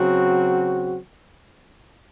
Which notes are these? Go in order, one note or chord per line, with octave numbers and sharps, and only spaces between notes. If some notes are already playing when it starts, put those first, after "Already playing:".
Already playing: C#3 F#3 C4 F#4